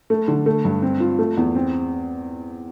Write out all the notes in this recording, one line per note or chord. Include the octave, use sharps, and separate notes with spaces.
A3
D3
A3
G2
C4
F4
A3
E2
C4